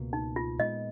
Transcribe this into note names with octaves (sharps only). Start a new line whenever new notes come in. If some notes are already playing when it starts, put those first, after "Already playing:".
Already playing: C#2 B2 A#3
D#4
F4
A#2 G#3 B3 D#5